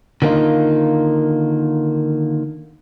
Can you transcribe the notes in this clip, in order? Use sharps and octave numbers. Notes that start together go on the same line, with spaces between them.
D3 D#3 A#3 C4 D#4 F4